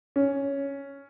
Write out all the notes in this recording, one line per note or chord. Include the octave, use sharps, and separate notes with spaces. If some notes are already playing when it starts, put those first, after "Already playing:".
C#4